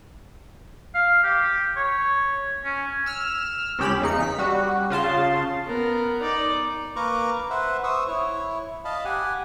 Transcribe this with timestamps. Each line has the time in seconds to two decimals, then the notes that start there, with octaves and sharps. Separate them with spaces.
0.95 F5
1.23 G4
1.77 C#5
2.64 C#4
3.06 E6 F6
3.79 C#2 C#4 G4 B5 E7
4.00 E2 C#3 D#4 C#7
4.20 B6
4.38 G3 F#4
4.90 C#3 F4 A5 C6
5.66 B3 A#4
6.22 D#4 D5
6.96 A#3 A#4 B4 A#5 C#6 D6
7.50 B4 C5 E5 F#5
7.84 C5 C#6 D#6 E6
8.08 E4 C#5
8.85 D#5 F5 A5 B5
9.05 G4 F#5 G#5